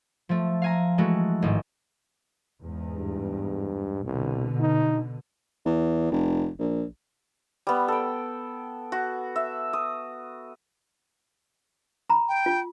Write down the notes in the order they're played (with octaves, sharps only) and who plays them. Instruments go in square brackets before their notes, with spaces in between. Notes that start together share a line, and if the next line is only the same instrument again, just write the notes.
[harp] F3 A3
F5 G#5 A#5
E3 G#3 A3 F#4
A1 G#2 D#3
[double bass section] E2 G#2
[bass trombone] G2
[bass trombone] C2 [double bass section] B2 D3
[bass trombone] D#4
[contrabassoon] E2
F1
A#1
[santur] G3 B3
A4 G5
F#4
E5
D#6
[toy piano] A#5 B5
[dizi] G5
[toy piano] F4